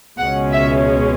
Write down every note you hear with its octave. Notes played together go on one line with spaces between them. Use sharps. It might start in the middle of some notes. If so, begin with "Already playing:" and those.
C#2 B2 G#3 C#4 F#5
E5